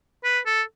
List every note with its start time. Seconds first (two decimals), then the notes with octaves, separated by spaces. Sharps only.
0.24 B4
0.46 A4